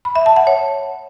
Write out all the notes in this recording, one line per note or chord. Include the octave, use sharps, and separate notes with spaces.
B5
E5
A5
F#5
C#5